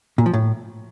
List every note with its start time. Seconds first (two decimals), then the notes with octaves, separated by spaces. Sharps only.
0.18 A#2
0.26 F3
0.33 A2